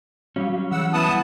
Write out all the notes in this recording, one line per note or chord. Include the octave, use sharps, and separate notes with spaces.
F#3 G3 C#4 F#4 F5
C#3 E3 F#5 E6
B3 E4 F#5 A5 D#6